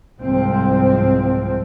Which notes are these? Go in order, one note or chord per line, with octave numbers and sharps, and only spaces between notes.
C2 G#2 F3 C4